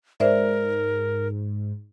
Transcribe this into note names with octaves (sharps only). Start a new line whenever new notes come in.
G#2 A#4 C5 D5 E5